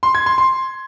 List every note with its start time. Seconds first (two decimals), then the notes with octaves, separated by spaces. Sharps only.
0.03 C6
0.15 G#6
0.26 C6
0.38 C6